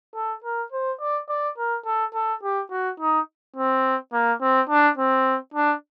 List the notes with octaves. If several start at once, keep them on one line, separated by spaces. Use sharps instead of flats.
A4
A#4
C5
D5
D5
A#4
A4
A4
G4
F#4
D#4
C4
A#3
C4
D4
C4
D4